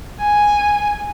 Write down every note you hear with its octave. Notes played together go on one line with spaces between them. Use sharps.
G#5